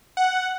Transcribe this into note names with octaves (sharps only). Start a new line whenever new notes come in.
F#5